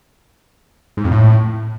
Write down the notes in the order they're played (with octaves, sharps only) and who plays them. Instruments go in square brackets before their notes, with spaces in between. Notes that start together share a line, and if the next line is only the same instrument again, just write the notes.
[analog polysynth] G#2
F2
A2